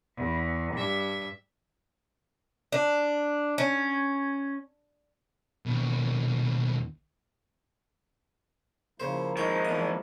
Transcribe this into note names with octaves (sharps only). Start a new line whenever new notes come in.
E2
G2 E5
D4
C#4
D#2 B2
C#3 F3 A#3 E4 C5
D#3 G#3 C#5 G5
E2 D#6